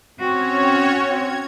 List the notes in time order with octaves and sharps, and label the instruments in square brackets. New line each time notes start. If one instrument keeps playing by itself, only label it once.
[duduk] C4 [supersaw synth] C#4 C#5 [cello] F#4
[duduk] C4 [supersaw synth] G#6